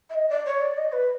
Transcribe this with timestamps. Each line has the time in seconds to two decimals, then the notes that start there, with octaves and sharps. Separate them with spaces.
0.09 E5
0.14 D#5
0.29 D5
0.45 C#5
0.61 D5
0.77 D#5
0.92 B4